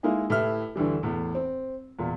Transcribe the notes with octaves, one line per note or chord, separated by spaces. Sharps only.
G#3 A#3 D#4 E4 G#4
A2 E4 G4 B4 E5 F6
D2 D3 E3 G3
E2 A2
C4
E2 A#2